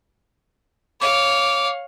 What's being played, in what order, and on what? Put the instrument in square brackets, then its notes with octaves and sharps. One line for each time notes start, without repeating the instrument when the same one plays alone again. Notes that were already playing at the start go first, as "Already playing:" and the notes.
[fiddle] C#5 F5 [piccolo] D6